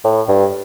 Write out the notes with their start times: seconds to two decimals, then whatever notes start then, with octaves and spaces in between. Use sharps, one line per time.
0.04 A2
0.28 G2